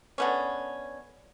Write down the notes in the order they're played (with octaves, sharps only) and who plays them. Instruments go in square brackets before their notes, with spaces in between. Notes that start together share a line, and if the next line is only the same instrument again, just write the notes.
[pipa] D3 B3 C#4